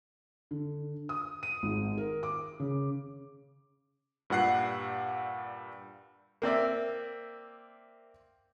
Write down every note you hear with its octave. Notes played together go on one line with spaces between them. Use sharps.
D3
D#6
D#7
G#1
A#4
D6
C#3
G2 A#2 G3 F#5 F#6 C7
A#3 C4 D5 E5